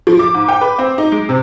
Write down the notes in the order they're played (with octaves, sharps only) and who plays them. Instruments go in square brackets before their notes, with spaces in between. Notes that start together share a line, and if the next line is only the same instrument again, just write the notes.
[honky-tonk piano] F3
D6
G#2
G5
B4
C4
D#4
G#3
C3